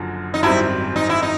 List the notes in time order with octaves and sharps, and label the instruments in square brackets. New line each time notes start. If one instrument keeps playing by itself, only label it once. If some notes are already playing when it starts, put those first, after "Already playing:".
Already playing: [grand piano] F#1 F#2 D3 F3
[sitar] D#4
[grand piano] G#1 F#2 D#3 G3 C4 [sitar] E4
[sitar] D#4
E4
D#4